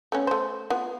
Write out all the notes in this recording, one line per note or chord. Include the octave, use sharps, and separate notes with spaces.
A3 B3 C#4
A3 C5
B3 F4